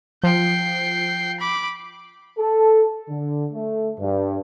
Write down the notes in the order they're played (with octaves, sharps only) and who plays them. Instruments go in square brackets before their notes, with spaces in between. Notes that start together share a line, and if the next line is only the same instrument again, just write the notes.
[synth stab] F3 [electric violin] G5 C7
[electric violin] B5 D6
[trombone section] A4
D3
A3
G2